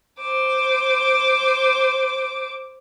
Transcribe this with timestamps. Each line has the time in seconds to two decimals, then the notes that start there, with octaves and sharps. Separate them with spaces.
0.21 C5 D6